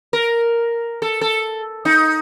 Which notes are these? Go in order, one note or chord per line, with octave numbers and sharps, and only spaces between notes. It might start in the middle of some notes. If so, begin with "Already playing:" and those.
A#4
A4
A4
D#4